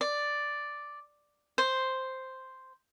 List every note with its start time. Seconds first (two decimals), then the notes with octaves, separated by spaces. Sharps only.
0.01 D5
1.58 C5